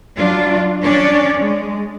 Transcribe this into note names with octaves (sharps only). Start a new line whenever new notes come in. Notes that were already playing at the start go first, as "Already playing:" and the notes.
F#3 D4 F4
C#4 D4 C#5 D5
G#3